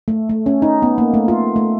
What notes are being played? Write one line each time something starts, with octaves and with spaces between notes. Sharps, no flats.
A3
A3
C#4
D#4
B3
A#3
A3
F4
A3